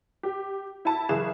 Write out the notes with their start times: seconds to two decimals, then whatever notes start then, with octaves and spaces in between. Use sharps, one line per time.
0.23 G4
0.85 E4 A5
1.09 F#1 E3 G#4 E7